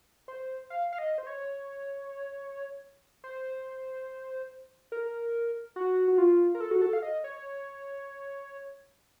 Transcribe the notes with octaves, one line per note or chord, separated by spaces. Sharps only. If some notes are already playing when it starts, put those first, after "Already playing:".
C5
F5
F5
D#5
C5
C#5
C5
A#4
F#4
F#4
F4
A#4
A4
F#4
A4
F5
D#5
C#5